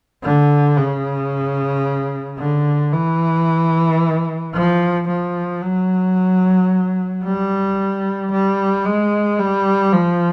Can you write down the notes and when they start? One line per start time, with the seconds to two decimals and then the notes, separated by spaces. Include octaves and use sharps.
0.23 D3
0.77 C#3
2.39 D3
2.92 E3
4.54 F3
5.08 F3
5.62 F#3
7.24 G3
8.32 G3
8.86 G#3
9.39 G3
9.93 F3